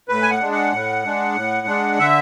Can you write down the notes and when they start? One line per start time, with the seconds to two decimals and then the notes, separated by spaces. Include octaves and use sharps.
0.09 A2 B4
0.22 G#5
0.30 F#5
0.41 G#3 D4
0.52 F#5
0.72 A2
1.05 G#3 D4
1.35 A2
1.67 G#3 D4
1.99 D3 E5